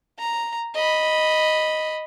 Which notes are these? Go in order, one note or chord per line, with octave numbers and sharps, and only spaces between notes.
A#5
D#5 B5